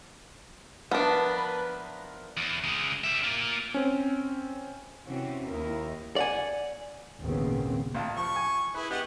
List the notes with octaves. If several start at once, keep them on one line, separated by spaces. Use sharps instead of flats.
F3 B3 D4 A#4 B4 E5
E2
C#3 G#3
G3 E5
A#3 F4
C4 C#4
C3 E3 C4 C#4 F#4
D#2 D#4 E4 A#4
D5 F#5 G#5
G#1 D#2 A#2 C#3 B3 C4
A1 F4 A5
F3 C#6
G#5
E4 G#4 B4
B3 G4 D#5 F#5